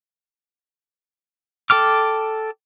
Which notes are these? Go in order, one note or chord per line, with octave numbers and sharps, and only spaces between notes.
A4 G5 D6 F6